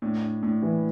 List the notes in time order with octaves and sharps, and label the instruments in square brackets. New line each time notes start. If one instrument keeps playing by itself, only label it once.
[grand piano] A2 [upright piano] D4
[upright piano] D4
[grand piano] A2 [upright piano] D4
[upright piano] E3